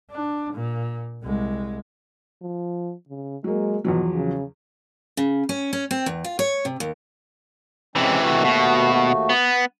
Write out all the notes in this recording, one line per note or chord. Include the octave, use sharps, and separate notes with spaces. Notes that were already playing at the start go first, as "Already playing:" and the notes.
D4
A#2
C2 G#3
F3
C#3
F#3 G#3 A#3
E2 B2 F3 F#3
C#3
C#3
C#4
C#4
C4
E2
F4
C#5
C3
D#2
C3 E3 G#3 C4 C#4
D#2 A3 F#4
B2
B3